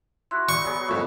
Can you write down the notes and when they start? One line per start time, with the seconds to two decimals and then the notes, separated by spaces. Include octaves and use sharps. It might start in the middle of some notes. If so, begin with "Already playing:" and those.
0.31 E4 F#4 C6 F#6
0.49 G3 F#4 D#5 C#6
0.64 F#3 B3 G#4
0.88 F2 F#3 E4 C#6